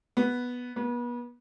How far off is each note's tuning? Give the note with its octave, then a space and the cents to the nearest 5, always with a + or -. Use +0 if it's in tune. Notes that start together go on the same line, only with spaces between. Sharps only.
B3 -5
B3 -35